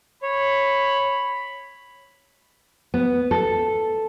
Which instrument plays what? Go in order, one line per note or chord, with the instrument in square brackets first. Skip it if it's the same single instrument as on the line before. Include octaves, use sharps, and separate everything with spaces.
[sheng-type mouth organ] C#5 [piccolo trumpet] B5
[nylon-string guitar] B3
A4